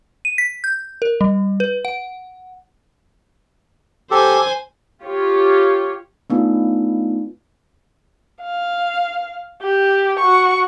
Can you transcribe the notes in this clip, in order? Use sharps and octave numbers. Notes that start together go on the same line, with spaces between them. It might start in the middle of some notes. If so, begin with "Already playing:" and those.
D#7
B6
G6
A#4
G3
B4
F#5
G4 A4 C5 G#5
F4 G4 C#5
A3 B3 D4 D#4 F4
F5
G4
F#4 C#6